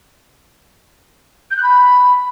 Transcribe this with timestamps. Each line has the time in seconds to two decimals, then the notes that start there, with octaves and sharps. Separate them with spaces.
1.51 G6
1.57 F#6
1.63 B5